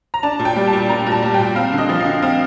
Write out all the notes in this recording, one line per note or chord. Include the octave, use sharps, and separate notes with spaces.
A#5
D4 A5
A#2
G5
G3
A5
A#2
D4 A#5
A#2
A5
G3
G5
A#2
C4 F5
D3
D#5
F3
F5
D3
C4 F5